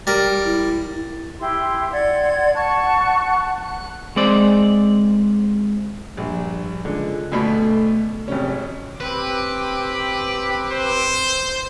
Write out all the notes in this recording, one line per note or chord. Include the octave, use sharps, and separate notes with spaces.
G3 A#4
E4
E4 G4 C6
D5 F#5 C6 G#6
F#5 A5 C#6 F#6
F#6
G#3 C4 D5
A#1 G2
C#2 D3 G#3
D2 B2 A3 B5
G#1 C3 C#4
C4 G4 B4 D6
C5